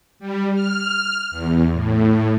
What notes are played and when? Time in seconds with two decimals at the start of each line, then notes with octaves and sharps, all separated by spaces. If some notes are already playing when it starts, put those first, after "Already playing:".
0.19 G3
0.55 F6
1.31 E2
1.73 A2